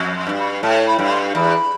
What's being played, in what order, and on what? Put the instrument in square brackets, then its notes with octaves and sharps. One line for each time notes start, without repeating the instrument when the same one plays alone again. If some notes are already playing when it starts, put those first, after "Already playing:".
Already playing: [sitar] F2
[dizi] C6
[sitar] G2
[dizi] B5
[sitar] A2 [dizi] A5
[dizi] B5
[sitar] G2
[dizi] B5
C6
[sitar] E2 [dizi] B5